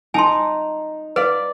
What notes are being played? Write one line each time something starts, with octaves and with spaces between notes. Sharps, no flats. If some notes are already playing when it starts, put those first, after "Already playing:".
D#4 G#5 A5 C6
B4 D5 F5